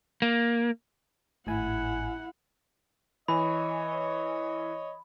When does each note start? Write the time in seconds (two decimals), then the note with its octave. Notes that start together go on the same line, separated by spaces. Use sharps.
0.22 A#3
1.47 G#1 A2 E4 F#5 G#5
3.28 E3 C#5 D#5 G#5 B5